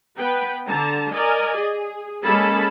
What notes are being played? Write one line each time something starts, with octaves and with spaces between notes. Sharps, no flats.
B3 B4 G5
D3 A5 A#5
A#4 D5 D#5 G#5
G#4
G#3 A#3 C#4 A4 A5 B5